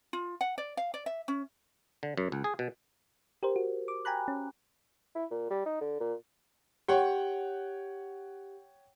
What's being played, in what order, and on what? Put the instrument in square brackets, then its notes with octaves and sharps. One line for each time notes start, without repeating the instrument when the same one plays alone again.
[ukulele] F4
F#5
D5
F5
D5
E5
C#4
[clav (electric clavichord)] D3
F#2
C#2
G#4
B2
[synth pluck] G4 A#4 C5
F#4
D6
G5 G#5 A#5 B5 F#6
C#4
[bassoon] E4
A#2
G3
D#4
D3
A#2
[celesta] G4 [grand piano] C#5 F#5 G5